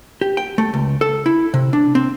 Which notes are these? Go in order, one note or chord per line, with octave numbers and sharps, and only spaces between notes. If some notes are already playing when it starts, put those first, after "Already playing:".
G4
G5
A3
C#2
A4
E4
C3
D4
C4